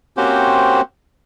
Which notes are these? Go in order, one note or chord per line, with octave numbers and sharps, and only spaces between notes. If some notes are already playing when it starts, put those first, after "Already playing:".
A#3 C4 C#4 F#4 G4 C5